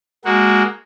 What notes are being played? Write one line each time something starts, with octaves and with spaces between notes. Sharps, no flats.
G#3 A#3 F#4